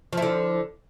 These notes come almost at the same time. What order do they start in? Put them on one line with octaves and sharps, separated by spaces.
F3 E4 D3